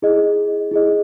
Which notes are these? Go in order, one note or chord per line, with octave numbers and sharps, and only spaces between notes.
E4 G#4 D#5
E4 G#4 D#5